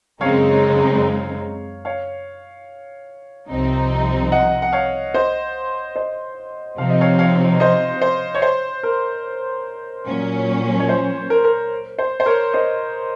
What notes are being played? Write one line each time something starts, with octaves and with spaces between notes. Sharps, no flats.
F#2 C#3 G#3 C4 D#4 C#5 F5
C#5 F5
C2 C3 F3 C4 D#4
D#5 F#5
F#5
C#5 F5
C5 D#5
C5 D#5
C3 F3 C4 D#4 F5
D#5
C#5 F5
C#5 F5
C5 D#5
C5
C#5
C5
A#4
A#2 F#3 C#4
C#5
C5
A#4
A#4
C5
C5
A#4 C#5
C5 D#5